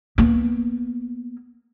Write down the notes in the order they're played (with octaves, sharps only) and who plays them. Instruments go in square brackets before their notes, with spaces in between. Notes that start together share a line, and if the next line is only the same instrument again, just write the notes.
[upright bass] A#3 B3